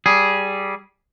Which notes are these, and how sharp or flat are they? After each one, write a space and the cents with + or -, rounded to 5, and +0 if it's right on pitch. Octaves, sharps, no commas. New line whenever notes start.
G3 -10 G#4 +5